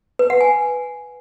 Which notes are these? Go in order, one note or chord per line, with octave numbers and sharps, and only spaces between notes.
B4
F#5
G#5